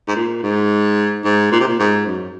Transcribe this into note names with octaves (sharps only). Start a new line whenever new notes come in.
G#2
A#2
G#2
G#2
A#2
C3
A#2
G#2
F#2